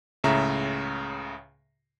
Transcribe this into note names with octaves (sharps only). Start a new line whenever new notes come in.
C#2 A2 C#3 E5 A#5